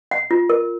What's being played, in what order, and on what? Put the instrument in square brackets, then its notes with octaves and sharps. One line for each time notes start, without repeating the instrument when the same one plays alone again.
[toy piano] F#5
F4
A#4